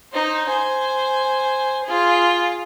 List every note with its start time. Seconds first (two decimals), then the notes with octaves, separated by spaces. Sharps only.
0.12 D#4 C5
0.48 C5 G#5
1.84 F4 G#4